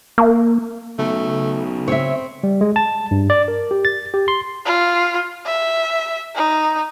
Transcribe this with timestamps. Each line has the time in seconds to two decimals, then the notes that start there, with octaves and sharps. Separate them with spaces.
0.18 A#3
0.99 B1 C#3 A3
1.88 C4 C#5 E5
2.43 G3
2.61 G#3
2.76 A5
3.11 G2
3.30 D5
3.48 A#4
3.71 G4
3.85 A6
4.14 G4
4.28 C6
4.66 F4
5.46 E5
6.35 D#4